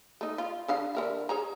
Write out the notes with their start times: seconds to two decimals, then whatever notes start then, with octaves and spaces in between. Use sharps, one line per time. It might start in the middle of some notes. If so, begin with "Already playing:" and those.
0.21 A3 D#4
0.38 F4
0.68 D3 D4 F5
0.95 D3 A#4 E5
1.29 G#4 C#5 A#5